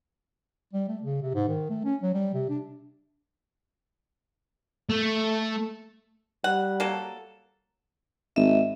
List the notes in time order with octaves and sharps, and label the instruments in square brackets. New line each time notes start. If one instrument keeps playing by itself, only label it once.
[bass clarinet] G3
A3
C#3
C3
G#2
D#3
A3
C#4
F#3
G3
C3
D4
[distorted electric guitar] A3
[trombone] G3 [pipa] F#5
[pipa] F#3 A#3 A4
[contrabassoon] G#1 [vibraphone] D#5 E5